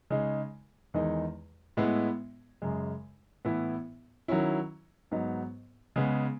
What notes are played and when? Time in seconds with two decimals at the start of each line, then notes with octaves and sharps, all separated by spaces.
0.10 C#3 G#3 D#4
0.94 E2 D#3 G#3 D#4
1.77 A2 G#3 B3 E4
2.62 F#2 C#3 G#3
3.45 A2 E3 B3 E4
4.28 D#3 F#3 C#4 E4
5.11 G#2 F#3 B3 D#4
5.96 C#3 G#3 B3